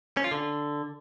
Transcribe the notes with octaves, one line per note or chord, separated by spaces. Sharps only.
C#4
F4
D3